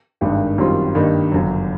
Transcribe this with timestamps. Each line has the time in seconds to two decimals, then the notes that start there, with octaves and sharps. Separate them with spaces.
0.21 G#1 G2 D#3 G#3
0.58 F#2 D#3 G3 C4 F4
0.95 G2 D#3 G3 A#3 D#4
1.32 G1 F#2 C#3 F#3